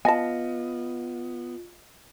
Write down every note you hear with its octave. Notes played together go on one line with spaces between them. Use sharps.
B3 F4 D#5 F5 G#5 A5 A#6